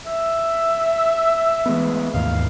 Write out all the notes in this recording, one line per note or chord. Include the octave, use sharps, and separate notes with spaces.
E5
E3 G#3 A3 B3
D#2 G#2 D#3 F5